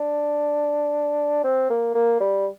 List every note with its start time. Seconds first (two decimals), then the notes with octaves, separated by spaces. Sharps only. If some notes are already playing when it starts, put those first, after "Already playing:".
Already playing: D4
1.44 C4
1.70 A#3
1.95 A#3
2.20 G3